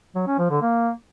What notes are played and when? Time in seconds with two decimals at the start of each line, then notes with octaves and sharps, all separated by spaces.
0.15 F#3
0.27 C#4
0.38 F3
0.50 D3
0.62 A#3